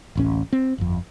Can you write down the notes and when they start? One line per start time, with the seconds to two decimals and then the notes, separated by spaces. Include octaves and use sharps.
0.15 D1 A1 C#4
0.53 C4
0.78 G1 F2